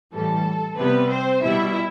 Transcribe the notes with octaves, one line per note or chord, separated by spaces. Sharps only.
A2 E3 G3 A4
C3 G3 B3 B4
C4 C5
B2 G3 E4 E5